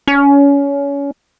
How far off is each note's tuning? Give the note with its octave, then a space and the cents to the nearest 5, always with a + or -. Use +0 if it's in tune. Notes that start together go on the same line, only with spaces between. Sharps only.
C#4 +25